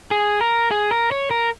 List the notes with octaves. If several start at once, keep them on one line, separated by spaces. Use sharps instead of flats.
G#4
A#4
G#4
A#4
C#5
A#4